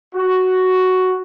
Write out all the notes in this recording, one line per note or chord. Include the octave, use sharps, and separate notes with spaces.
F#4